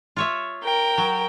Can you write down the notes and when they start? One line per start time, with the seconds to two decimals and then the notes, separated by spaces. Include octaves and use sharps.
0.17 F4 C#5 E5
0.62 A#4 G5
0.98 F#3